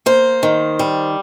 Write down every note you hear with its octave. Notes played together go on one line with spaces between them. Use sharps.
A#3 C5
D#3
G3